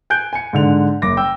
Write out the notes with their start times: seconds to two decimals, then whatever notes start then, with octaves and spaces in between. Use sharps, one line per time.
0.10 G#5 F#6 G6 D7
0.33 G#5 C#7
0.53 G#2 D3 F7
1.02 F#1 D6 A#6
1.17 G5 E6